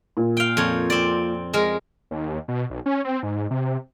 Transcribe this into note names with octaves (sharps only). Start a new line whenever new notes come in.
A#2
F5 G5
F2 C#5
C4 D5
G#3 A#4
D#2
B2
B1
C#4
C4
G#2
C3